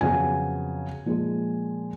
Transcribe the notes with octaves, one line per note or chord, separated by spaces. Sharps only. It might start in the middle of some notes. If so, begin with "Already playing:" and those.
F2 C#3 F#3 B3 G#5
A#2 F3 G#3